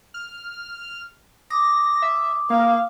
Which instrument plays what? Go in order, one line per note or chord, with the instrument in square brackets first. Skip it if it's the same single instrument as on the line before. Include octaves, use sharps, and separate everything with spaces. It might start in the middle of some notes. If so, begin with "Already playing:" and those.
[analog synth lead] F6
[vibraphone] D6 D#6 [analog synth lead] A#6
[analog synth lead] E5
[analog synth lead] A#3 [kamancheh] F5